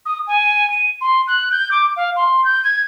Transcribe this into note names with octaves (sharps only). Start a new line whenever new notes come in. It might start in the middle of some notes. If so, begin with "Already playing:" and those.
D#6
G#5
D#7
C6
F#6
G6
D6
F5
C6
G6
G#6